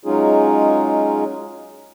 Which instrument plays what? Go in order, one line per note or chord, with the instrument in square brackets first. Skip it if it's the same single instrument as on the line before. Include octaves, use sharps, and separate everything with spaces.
[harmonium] F#3 G#3 C#4 D#4 F4 G#4